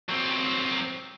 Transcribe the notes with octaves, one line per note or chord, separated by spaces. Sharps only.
F#3 C4